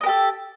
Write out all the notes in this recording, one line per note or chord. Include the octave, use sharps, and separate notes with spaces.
G4 A4 A#4 D#5